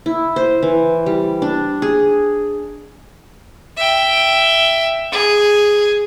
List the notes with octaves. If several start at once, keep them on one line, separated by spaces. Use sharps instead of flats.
E4
C5
E3
G3
D4
G#4
E5 G5
G#4